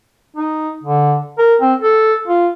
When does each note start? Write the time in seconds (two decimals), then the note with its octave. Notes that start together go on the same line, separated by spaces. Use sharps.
0.37 D#4
0.84 D3
1.38 A#4
1.62 C4
1.82 A4
2.28 F4